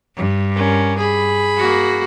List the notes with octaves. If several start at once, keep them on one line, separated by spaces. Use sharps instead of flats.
G2
C#4 A#4
G#4 B5
A#3 F#4